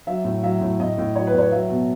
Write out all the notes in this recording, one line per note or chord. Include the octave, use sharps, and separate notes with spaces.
F#3 E5
A2
F#3 E5
A2
A2 D#5
A2
F#3 C#5
B4
A2 C#5
F#3 E5
B2